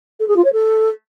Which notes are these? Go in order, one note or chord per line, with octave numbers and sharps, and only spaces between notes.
A4
G#4
F4
C#5
A4